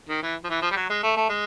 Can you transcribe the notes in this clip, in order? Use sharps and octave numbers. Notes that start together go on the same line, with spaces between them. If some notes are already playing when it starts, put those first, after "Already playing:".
D#3
E3
F3
E3
F3
G3
F#3
G#3
A3
A3
G#3